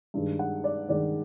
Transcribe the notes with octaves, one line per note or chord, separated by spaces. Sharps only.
G2 D#3 G#3
F#5
D5
G2 D#3 G#3 D5